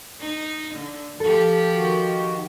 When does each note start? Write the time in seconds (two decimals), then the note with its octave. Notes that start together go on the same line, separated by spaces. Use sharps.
0.21 D#4
0.76 D3
1.20 F3 G4 A4
1.75 D#3 F#4